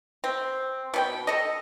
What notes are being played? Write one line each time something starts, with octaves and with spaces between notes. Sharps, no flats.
C4
B2 C#4 G5
A4 D#5